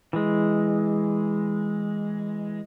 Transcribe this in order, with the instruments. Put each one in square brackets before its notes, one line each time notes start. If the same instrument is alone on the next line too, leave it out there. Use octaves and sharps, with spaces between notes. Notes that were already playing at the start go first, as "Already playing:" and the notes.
[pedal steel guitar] E3 G#3